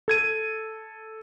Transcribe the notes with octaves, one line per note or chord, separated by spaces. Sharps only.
A4 G#6 D#7